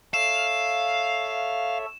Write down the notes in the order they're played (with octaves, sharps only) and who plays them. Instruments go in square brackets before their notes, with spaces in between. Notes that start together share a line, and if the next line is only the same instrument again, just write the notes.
[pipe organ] A4 C#5 E5 [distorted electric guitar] F5 [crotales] E7